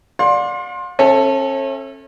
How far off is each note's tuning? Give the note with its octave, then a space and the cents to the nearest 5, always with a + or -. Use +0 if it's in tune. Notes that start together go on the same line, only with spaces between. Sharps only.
D5 +0 F5 +45 C6 +20
C#4 -40 A4 +0 E5 +0